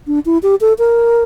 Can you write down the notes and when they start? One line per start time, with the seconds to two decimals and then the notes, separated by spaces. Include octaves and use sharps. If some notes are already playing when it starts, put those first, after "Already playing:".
0.07 D4
0.26 E4
0.43 G4
0.61 A4
0.79 A#4